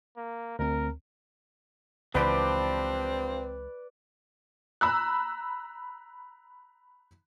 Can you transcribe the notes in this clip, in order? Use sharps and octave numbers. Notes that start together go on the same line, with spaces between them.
A#3
D2 C4 A#4
C#2 E3 F3 C4 D4 G4 B4 D5
A#5 B5 E6 F#6